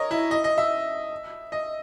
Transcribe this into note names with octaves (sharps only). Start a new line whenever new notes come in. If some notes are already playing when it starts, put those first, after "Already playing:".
Already playing: A#4 C#5 D#5
E4
D#5
D#5
E5
D#5